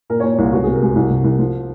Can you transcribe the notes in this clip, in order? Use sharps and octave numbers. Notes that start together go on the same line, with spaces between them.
A#2 A#4
A#2 C#5
C2 F4
C#2 F#4
C3 G#4
A#4
G#3 F#4
C2
C3
C2
F3